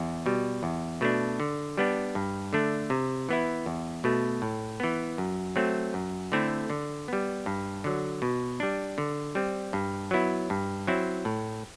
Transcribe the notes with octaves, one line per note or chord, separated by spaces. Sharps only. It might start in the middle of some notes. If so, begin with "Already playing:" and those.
Already playing: E2
B2 G3
E2
B2 A3 D4
D3
G3 B3 D4
G2
D3 A3 D4
C3
E3 B3 E4
E2
B2 A3
A2
E3 B3
F#2
F#3 A3 C4
F#2
D3 A3 C4 E4
D3
G3 B3
G2
D3 F#3
B2
G3 D4
D3
G3 C4
G2
F#3 B3 E4
G2
F#3 C4 E4
A2